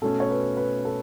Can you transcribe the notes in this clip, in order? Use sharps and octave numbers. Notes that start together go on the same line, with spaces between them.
B2 A3 C#4 A4
C#5
B4
B4
A4